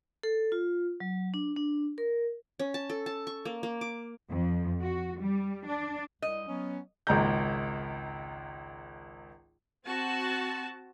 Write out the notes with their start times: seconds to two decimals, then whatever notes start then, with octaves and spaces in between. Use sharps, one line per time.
0.23 A4
0.52 F4
1.00 F#3
1.34 D4
1.56 D4
1.98 A#4
2.59 C#4
2.74 A5
2.90 A4
3.06 A5
3.27 C#6
3.45 A#3
3.63 A#3
3.81 D6
4.29 F2
4.81 F#4
5.21 G3
5.65 D4
6.22 C2 D#5
6.47 F#3 B3 C#4
7.07 G#1 C#2 A#5 G6
9.86 C4 F#4 A5